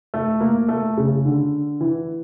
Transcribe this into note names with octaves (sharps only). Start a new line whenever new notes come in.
A3
A#3
A3
C#3
D3
E3